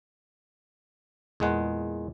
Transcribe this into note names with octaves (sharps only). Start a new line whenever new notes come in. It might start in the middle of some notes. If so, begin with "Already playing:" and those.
E2 A#2 G#3 F#5